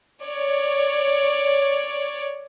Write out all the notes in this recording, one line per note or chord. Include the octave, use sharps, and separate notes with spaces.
C#5 D5